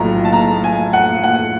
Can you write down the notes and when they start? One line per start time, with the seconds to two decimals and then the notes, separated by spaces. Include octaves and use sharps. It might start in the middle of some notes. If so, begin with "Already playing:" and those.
Already playing: B1 A2 F3 A#5
0.25 A5
0.33 A#5
0.64 G#5
0.93 F#5
1.24 F#5